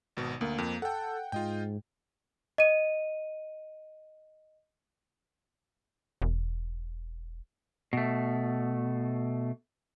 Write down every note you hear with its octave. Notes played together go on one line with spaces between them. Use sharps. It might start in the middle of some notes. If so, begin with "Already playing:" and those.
G#1 B2
D2 A#3
F2
A4 F#5 G5
G#2 F4 D#5 G5
D#5 D#7
E1
B2 A3